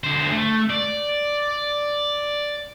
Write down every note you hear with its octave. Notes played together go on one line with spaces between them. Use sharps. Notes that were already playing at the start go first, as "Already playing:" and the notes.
D3 C5
A3
D5